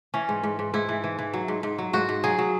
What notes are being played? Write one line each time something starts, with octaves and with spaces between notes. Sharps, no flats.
E3 C#4
G#2
G#2
G#2
G#2 E4
E3
E3
E3
F#3
G#2
G#2
F#3
G#2 F#4
G#2
F#3 G#4
F#3